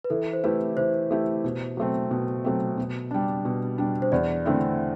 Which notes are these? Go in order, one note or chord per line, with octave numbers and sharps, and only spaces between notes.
B4
E3 A4
C5
A3 E4 G4 B4
E3 C5
A3 E4 G4
B2
F#3 A3 C4
B2
F#3 A3 C4
B2
G3 D4
B2
G3 D4
C5
E2 D5
D3 A3 C4 E4